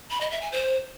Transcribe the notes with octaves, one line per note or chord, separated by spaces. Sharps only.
B5
D#5
E5
G#5
C5